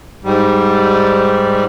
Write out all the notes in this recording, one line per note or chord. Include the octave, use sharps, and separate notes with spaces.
G#2 G3